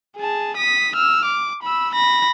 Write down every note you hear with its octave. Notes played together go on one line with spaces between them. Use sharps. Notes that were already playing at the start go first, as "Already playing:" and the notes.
G#4 A5
D#6 B6
E6 F6
D6
B5 E6
B5 A#6